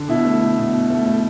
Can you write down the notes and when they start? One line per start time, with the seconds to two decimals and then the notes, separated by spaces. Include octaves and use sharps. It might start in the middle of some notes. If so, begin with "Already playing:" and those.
Already playing: D3
0.09 B2 E4
0.25 A3
0.41 A3
0.58 B2
0.74 B2
0.90 A3
1.06 A3